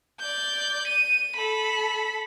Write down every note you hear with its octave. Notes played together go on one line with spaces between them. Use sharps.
D5 G6
D#7
A4 B5